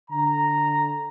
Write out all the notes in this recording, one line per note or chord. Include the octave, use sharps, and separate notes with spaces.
D3 A#5